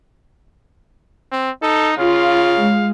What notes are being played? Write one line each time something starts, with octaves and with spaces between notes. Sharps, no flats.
C4
D#4 A4
C#3 F4 F5
G#3